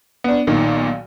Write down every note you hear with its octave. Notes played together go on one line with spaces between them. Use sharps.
B3 D4
B1 A#2 D#3